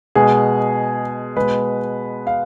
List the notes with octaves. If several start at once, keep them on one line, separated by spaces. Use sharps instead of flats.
B2 G#3 G#4
B2 G#3 B4
F5